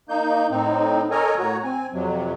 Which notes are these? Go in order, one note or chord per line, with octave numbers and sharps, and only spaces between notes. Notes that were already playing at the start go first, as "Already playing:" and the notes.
A#3 D#4 G6
A2 C4 D#4
A4 A#4 C#5 D#5 G#5 A#5
A2 F#4 C#5 A#5
C4 G#5
F2 C3 F#3